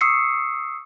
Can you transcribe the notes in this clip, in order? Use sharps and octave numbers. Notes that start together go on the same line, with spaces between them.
C#6 D#6 E6 C7 C#7